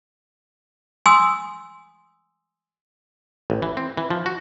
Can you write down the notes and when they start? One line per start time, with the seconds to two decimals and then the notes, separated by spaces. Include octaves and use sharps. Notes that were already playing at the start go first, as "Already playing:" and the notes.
1.06 G#5 C6 D#6 E6
3.50 A1
3.62 E3
3.77 C4
3.97 E3
4.10 F3
4.26 F#4